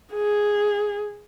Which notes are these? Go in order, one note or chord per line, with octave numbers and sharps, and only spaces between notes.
G#4